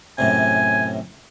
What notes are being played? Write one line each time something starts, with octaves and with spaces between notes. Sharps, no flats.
F#2 A2 C3 G#5